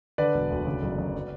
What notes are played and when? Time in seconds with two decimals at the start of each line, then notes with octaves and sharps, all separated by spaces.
0.18 D3 B4 D5
0.34 E1
0.50 D2
0.66 C#3
0.82 F#1
0.98 F#2
1.15 F#3